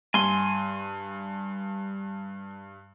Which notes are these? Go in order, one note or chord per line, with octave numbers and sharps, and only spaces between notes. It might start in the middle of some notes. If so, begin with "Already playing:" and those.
G2 G#5 C6